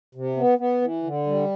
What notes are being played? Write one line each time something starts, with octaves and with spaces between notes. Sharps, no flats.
C3
B3
B3
E3
D3
G3